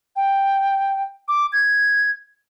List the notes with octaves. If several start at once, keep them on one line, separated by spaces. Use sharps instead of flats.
G5
D6
G#6